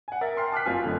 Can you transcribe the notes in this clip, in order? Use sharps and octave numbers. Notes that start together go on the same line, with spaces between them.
F#5 G#5
A#4 E5 A6
G5 C6 F6 C7
A5 D6 F6 F#6 B6
F#1 C4 F4 F#4 G#5 F6
F#1 F#2 D3